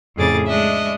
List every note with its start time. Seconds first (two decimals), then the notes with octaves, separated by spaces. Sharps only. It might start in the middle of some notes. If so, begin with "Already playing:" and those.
0.16 F2 A2 C#3 G#4 D6 A6
0.46 G#3 D4 D#5 E5